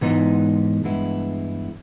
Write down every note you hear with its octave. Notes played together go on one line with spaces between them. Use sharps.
G#2 E3 G#3 B3 D#4
G2 E3 G#3 B3 E4